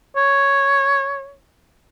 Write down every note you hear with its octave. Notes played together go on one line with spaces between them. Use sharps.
C#5